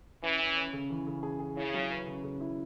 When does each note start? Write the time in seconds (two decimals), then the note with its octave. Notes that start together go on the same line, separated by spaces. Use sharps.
0.23 E3 C#4
0.40 C#4
0.57 C#4
0.73 C#3
0.90 E3
1.07 C#3
1.23 G#4
1.40 G#4
1.57 C#3 E4
1.74 F#3
1.91 B4
2.06 C#3
2.24 C#3
2.40 E4